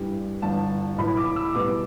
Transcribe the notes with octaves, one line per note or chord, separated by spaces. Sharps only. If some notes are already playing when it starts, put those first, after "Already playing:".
Already playing: G2 E3 G3 G5
G1 G2 E3 A5
B1 A2 E3 B5
D6
E6
E2 B2 G3 B3 D6